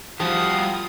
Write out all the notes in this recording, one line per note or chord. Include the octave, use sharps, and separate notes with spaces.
F3 G3 F#4 G4 F5 D#6